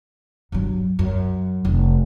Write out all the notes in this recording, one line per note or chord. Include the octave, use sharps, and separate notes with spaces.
G2 F#3
F#2
F1